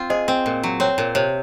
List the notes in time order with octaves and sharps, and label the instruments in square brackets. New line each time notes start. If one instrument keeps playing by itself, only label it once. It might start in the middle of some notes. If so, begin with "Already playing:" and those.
Already playing: [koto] C4 F4
[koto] G#4 [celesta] C5 D#5
[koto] C4
A#2
F#3
[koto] C4 [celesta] C#5
[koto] A#2
[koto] C3 [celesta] C#5